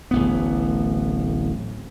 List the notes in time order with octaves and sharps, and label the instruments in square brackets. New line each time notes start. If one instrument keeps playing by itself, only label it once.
[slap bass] D1 A1 B3